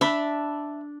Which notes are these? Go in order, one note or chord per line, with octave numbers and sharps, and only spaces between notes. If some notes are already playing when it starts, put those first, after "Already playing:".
D4 E5 B5